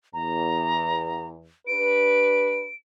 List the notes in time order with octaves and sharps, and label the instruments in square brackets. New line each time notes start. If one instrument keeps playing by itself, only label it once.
[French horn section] E2 [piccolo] A#5
[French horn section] D4 G4 B4 [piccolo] D7